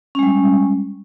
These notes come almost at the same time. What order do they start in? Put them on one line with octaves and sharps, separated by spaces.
C#4 G#3 G3